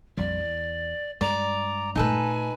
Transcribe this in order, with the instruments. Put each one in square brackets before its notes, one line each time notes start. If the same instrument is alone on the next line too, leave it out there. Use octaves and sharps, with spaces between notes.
[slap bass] A#1 F2 G3 [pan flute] D5
[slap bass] E2
[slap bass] G2 G#3 [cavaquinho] D5 [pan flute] A#5
[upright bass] A#2 A3 [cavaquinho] D#4 A4 B4 [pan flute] G#5